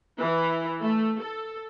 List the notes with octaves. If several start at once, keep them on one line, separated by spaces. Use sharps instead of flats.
E3
A3
A4